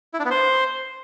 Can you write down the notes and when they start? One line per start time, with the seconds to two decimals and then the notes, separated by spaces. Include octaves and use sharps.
0.14 E4
0.19 D4
0.25 B3
0.31 C5